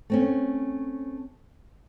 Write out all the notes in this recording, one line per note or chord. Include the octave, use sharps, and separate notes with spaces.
A3 C4 C#4